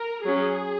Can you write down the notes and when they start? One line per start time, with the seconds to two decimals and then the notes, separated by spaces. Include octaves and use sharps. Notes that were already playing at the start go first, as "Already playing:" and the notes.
Already playing: A#4
0.24 F#3 C#4 G#4